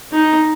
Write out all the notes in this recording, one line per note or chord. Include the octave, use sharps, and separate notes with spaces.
D#4